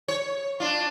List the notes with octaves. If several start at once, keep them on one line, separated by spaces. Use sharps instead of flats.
C#5
D4 F4